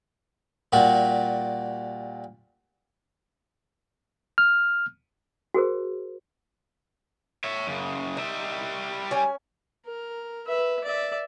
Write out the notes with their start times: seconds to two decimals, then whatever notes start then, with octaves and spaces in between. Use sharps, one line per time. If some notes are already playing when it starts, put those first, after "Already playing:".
0.73 A#2 G3 F#4
4.38 F6
5.54 F#4 G#4 A#4 C5
7.44 C#5 E5
7.67 F#2 C#3
8.17 G3 D#4 E5
9.11 C#4 G#5
9.86 A#4
10.47 B4 E5
10.84 D5 E5